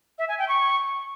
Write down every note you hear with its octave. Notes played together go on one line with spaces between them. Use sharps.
E5
G#5
G5
C#6